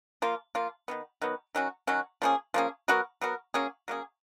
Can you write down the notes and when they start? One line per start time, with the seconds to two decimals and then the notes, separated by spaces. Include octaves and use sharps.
0.22 F3 A#3 F4
0.55 F3 A#3 F4
0.88 D#3 F#3 B3
1.21 D#3 F#3 B3
1.55 D#3 F#3 C#4 F#4
1.87 D#3 F#3 C#4 F#4
2.22 F3 A#3 C#4 G#4
2.54 F3 A#3 C#4 G#4
2.88 F#3 B3 F#4 A#4
3.21 F#3 B3 F#4 A#4
3.54 F#3 A#3 C#4 G#4
3.88 F#3 A#3 C#4 G#4